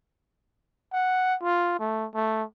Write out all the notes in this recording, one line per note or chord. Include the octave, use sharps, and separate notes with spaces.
F#5
F4
A3
A3